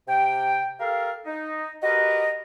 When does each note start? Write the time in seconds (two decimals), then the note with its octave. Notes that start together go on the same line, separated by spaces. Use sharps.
0.08 C3 G5
0.80 G4 A4 A#4 F5
1.24 D#4
1.82 F#4 G4 A#4 B4 D#5